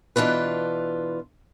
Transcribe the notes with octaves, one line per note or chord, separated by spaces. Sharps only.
B2 E3 D4 F4 B4